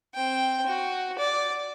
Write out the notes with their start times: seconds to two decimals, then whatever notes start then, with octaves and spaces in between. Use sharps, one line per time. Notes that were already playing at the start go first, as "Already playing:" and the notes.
0.14 C4 G5
0.66 F#4
1.18 D5